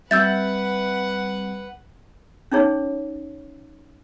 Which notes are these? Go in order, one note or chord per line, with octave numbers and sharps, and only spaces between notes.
G3 C4 B4 E5 F#5 E6 G6 A6
C#4 D#4 G#4 C#5